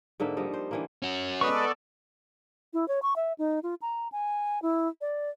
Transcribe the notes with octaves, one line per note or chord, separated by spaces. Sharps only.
G#2 D3 A#3 E5
F3 G3 D#4
C5
D3 E3 A#3
C#4 F#4
G#3 B3 A4 B4 D5 C#6 D#6
E4
C#5
C#6
E5
D#4
F4
A#5
G#5
E4
D5